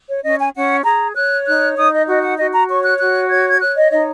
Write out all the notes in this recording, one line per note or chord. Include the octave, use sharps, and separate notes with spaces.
C#5
C#4 D#5
G#5
C#4 F#5
G#4 A#5
C#5 F#6
D#4 F#6
D#4 D#6
D#5
F#4 D#5
F#5
F#4 D#5
A#5
C#5 C#6
F#6
F#4 F#6
C#5 G#6
G#6
C#5 F#6
D#5
D#4 D#5